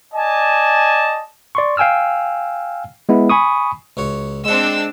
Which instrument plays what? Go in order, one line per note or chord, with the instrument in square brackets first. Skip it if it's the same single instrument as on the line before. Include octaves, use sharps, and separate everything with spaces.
[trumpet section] D5 D#5 G#5 A5
[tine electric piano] D5 C6 C#6
F5 G5 G#5 E6 F6
G#3 B3 E4
G#5 B5 C#6 D#6
[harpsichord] C#2 F#4 C#5
[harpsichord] G#3 F#5 [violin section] C4 D4 E6